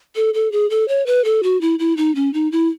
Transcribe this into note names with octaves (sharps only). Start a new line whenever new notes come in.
A4
A4
G#4
A4
C#5
B4
A4
F#4
E4
E4
D#4
C#4
D#4
E4